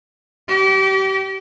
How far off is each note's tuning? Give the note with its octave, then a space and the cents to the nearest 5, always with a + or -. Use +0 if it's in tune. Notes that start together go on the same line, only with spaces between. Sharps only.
G4 -30